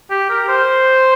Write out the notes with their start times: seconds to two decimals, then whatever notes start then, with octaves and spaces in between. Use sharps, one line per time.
0.10 G4
0.30 A#4
0.48 C5